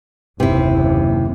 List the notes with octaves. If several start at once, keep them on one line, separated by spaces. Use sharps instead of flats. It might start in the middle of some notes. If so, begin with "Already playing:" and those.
F#1 D#2 C3 E4